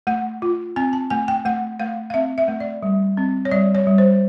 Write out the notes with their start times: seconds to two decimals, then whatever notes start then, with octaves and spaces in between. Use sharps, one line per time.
0.07 A3 F#5
0.42 F4
0.76 C4 G#5
0.93 A5
1.10 A3 G#5
1.28 G5
1.45 A3 F#5
1.80 A3 F5
2.10 F5
2.14 C4 E5
2.38 E5
2.48 A3
2.60 D5
2.83 G3
3.17 C4
3.45 C#5
3.51 G3 D5
3.75 C#5
3.87 G3
3.98 C5